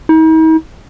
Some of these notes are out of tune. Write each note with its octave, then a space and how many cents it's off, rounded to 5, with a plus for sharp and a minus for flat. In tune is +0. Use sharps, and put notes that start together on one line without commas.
D#4 +45